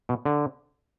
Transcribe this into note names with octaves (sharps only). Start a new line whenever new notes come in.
B2
D3